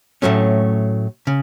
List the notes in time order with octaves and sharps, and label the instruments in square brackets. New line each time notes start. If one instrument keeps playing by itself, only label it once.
[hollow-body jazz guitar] A2 F#3 A3 C#4
C#3